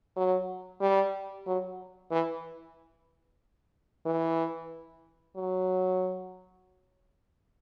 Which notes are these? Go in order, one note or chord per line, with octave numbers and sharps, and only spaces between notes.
F#3
G3
F#3
E3
E3
F#3